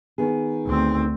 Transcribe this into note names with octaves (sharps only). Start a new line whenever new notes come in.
D#3 B3 G#4
D2 C4